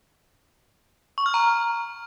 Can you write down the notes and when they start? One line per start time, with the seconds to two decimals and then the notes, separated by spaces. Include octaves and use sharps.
1.18 C#6
1.26 F6
1.34 A#5